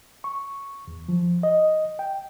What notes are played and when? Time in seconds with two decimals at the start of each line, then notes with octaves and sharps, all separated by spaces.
0.24 C#6
0.88 E2
1.09 F3
1.43 D#5
1.99 G5